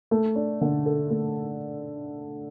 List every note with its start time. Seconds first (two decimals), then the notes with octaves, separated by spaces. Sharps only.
0.11 A3
0.36 D4
0.61 D3
0.86 A4
1.10 A3